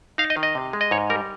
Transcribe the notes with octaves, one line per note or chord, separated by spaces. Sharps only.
D#4 F5
D#5
D#3
D#5
C3
G#3
D#5
G#2 C#5
G3 A#4